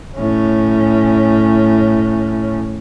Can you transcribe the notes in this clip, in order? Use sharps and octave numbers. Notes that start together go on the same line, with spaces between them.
A2 C#4